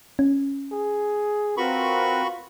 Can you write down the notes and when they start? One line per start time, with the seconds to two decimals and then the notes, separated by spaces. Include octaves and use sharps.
0.19 C#4
0.72 G#4
1.57 C4 F4 F#4 A#4 B4 B5 C#6